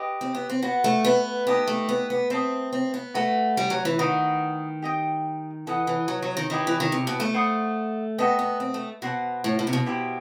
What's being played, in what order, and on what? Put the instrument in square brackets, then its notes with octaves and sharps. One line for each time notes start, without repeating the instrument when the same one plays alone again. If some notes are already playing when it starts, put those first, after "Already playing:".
Already playing: [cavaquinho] G4 B4 D#5
[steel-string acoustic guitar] C4
B3
C4
[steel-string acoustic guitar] B3 [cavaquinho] F#4 B4 F#5
[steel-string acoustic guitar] A3
B3
[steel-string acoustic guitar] B3 [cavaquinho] D#4 G4 D#5 A5
[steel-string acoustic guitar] A3
B3
B3
[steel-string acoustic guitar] C4 [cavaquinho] C5 E5 A5 D#6
[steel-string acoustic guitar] C4
B3
[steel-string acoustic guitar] A3 [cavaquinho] F#4 B4 F#5 B5
[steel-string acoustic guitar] G3
F#3
E3
[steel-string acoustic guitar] D#3 [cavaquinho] F#4 B4 D#5 F#5
[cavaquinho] G4 D#5 G5 D#6
[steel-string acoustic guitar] E3 [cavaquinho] A4 D#5 F#5
[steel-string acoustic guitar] E3
F#3
F#3
D#3
[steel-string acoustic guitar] D#3 [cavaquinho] E4 G4 B4 D#5
[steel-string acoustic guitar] E3
D#3
C3
B2
A3
[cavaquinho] C5 F#5 B5 D#6
[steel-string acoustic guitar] B3 [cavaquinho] F#4 A4 D#5 G5
[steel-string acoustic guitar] B3
C4
A3
[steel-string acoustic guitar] B2 [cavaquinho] F#4 C5 F#5 A5
[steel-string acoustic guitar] A2
A2
C3
B2
[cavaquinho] E4 G4 C5 E5